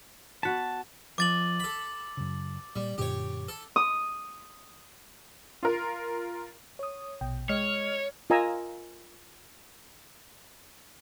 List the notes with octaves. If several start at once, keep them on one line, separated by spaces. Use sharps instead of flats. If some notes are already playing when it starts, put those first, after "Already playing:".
B3 F#4 A5 B6
F2 D6 A6 F#7
A4 B5
F#2 C#3
A#2 G3
F#2 A#2 D3 G4 C#5
A4
D#6
F4 A#4
C#5 D#6
A#1 B2 G5
G#3 C#5 D#5 F6
F4 A#4 D#5 G#5 A#5 E6